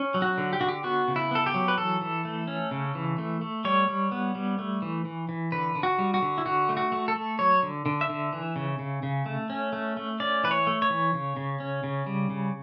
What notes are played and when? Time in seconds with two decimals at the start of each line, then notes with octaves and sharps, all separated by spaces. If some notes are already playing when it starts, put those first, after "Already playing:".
Already playing: C#4
0.14 F#3
0.22 F#4
0.38 D3
0.53 G4
0.61 D3 F#4
0.68 G4
0.84 B3 F#4
1.08 C#3
1.16 E4
1.31 B3 A4
1.46 G4
1.54 F#3
1.68 B4
1.78 E3 A4
2.01 E3
2.25 A3
2.47 C#4
2.71 C#3
2.95 E3
3.18 A3
3.41 A3
3.65 G3 C#5
3.88 G3
4.12 B3
4.35 G3
4.59 A3
4.82 E3
5.05 E3
5.29 E3
5.52 D3 B4
5.75 D3
5.83 F#4
5.99 G3
6.14 F#4
6.22 D3
6.38 E4
6.46 D3 F#4
6.69 A3
6.77 F#4
6.92 A3
7.08 A4
7.16 A3
7.39 F#3 C#5
7.63 D3
7.86 D3
8.01 E5
8.10 D3
8.33 E3
8.56 C#3
8.79 C#3
9.03 C#3
9.26 A3
9.50 C#4
9.73 A3
9.97 A3
10.20 C#4 D5
10.44 E3 B4
10.51 C#5
10.67 A3
10.82 C#5
10.90 E3
11.14 C#3
11.37 C#3
11.60 C#4
11.84 C#3
12.06 G3
12.30 C#3